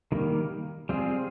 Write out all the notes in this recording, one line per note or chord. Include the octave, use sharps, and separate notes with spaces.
D#3 G3 A#3
G3 C4 F4 G#4